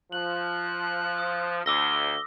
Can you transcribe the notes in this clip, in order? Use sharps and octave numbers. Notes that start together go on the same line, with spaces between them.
F3 F#6 F#7
D#6
D2 D6 E6 A#6 G7